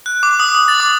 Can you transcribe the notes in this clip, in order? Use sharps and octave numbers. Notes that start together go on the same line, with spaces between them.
F#6
D6
D#6
D#6
A6
D6